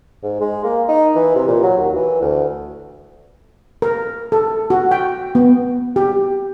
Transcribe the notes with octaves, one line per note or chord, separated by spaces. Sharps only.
G#2
G#3
A#3
D#4
E3
C3
A#2
F#3
D#2
E3
D2
A#4
A4
F#4
G5
B3
G4